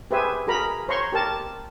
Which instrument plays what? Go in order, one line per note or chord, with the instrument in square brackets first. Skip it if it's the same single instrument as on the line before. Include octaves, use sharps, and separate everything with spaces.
[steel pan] G4 G#4 B4 C5 E5 G#5
F#4 G#4 A#4 A#5 B5
C5 C#5 A#5 C6 C#6
G4 A#4 A5